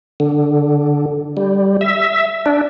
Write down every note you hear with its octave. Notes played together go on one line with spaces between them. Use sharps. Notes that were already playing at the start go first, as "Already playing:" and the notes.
D3
G3
E5
D4